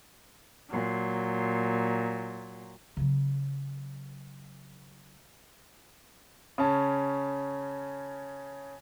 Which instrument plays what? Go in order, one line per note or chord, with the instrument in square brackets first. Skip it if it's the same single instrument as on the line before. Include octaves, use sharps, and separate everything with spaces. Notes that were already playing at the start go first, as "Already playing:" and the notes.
[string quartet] A#2 F#3
[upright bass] C#3 F#3
[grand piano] C#3 C#4 A5